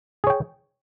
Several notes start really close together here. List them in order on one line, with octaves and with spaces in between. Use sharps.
G#4 C#5 G5